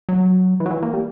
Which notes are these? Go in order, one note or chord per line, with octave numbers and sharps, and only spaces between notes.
F#3
E3
F#3
E3
A#3
G3